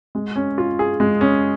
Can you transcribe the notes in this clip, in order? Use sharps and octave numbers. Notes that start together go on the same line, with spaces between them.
G#3
C#4
F4
G#4
G#3
C#4